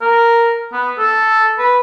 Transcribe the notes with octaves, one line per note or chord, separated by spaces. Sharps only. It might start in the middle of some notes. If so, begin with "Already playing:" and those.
A#4
B3
A4
B4